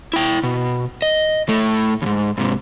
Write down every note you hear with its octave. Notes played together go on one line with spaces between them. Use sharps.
E4 G5
B2
D#5
A2 A3
D#2 G#2
G#2 C3